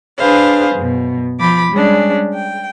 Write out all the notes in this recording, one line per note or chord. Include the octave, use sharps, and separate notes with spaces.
D4 G#4 B4 C5 F5
F#2 B2
F3 B5 D6
G3 G#3 C#4 D4
G5